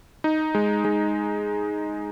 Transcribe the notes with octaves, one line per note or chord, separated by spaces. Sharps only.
D#4
G#3
G#3